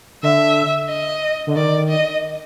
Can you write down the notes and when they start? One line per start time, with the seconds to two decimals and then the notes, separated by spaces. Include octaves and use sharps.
0.23 D3 E5
0.89 D#5
1.47 D3
1.56 D#3 D5
1.89 D#5